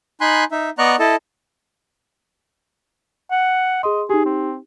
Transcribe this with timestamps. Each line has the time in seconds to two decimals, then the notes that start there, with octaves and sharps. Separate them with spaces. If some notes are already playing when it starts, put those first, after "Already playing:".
0.21 D#4 G#5 B5 C6 F#6
0.51 D#4 E5
0.78 B3 D5 D#5 A#5 C#6 F#6
0.99 E4 A4 D#5 A5
3.31 F#5
3.83 G#4 D#5 C6
4.09 D#4 G4 G#4
4.25 C4